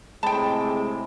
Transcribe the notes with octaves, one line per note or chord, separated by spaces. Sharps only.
A2 C3 G#3 G5 A5 B5